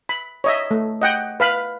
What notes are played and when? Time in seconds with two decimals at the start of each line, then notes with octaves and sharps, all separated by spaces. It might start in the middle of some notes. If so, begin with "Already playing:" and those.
0.09 B5
0.44 C#5 D#5 E5
0.71 A3
1.02 D#5 F#5 G5
1.40 B4 F5 B5